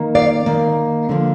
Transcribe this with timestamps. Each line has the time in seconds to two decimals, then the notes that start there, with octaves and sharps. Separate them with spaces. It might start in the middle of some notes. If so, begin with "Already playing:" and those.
Already playing: D#3 A#3
0.15 D5 F5
0.46 D#3 A#3
1.09 D3 F3 A#3